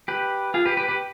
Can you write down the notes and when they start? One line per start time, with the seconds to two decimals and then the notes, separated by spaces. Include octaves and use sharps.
0.08 G4 B4
0.54 F4 G#4
0.66 G4 B4
0.77 G4 B4
0.88 G4 B4